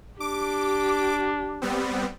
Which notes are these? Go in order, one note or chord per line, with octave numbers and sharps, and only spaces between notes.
D4 G4 D6
G3 B3 C4